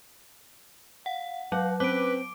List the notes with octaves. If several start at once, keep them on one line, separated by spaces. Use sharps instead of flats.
F5 F#5
F#3 F5 F#5
C4 C#4 B4 D6 D7